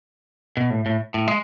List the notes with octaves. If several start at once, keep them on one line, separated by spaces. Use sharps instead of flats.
B2
A2
A2
A2
G#3